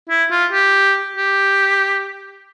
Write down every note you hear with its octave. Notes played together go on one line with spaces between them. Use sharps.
E4
F4
G4
G4